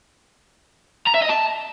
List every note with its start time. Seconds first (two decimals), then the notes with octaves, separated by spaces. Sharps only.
1.07 A#5
1.14 E5
1.22 D#5
1.29 A5